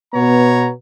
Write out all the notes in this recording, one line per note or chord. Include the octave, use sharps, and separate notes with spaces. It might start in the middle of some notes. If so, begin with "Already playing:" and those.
B2 B3 C#5 A#5